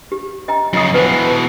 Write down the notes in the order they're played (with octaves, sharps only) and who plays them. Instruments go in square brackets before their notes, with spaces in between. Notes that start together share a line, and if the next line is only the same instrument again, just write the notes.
[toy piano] G4
D#5 G5 A#5
[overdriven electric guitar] F#2 C#3 [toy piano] F4 D#5 D#6
[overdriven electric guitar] B2 E3 [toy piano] B4 C5